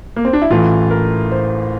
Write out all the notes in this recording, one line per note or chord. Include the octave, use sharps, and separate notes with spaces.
A#3
C4
D4
E4
A1 A2 E3 F4
A#4
C5